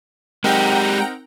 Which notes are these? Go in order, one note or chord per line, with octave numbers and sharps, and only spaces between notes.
G#3 C4 D#4 G4 A#4 F#5 G5 A#5